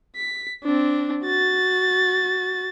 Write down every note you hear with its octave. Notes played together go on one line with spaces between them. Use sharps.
B6
C4 D4
F#4 A6